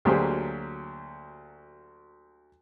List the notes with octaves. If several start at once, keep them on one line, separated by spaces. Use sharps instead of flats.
D2 F#3 A#3 G4 G#4 C5